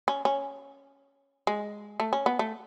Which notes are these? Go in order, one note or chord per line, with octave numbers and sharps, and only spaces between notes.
C#4
C#4
G#3
A3
C#4
B3
A3